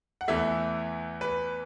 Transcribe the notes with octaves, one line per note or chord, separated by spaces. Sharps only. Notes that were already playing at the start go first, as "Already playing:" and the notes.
F#5
E2 E3 A3 E5
B4